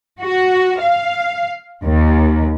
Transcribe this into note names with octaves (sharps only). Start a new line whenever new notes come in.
F#4
F5
D#2